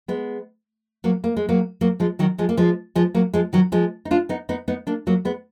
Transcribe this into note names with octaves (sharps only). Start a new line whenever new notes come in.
G#3 B3
F#3 A#3
A#3
G#3
F#3 A#3
F#3 A#3
F3 G#3
D#3 F#3
F3 G#3
A#3
F3 G#3
F3 G#3
F#3 A#3
F3 G#3
D#3 F#3
F3 G#3
D#4
D4 F4
B3 D#4
B3 D#4
B3 D#4
A#3 D4
F#3 A#3
G#3 B3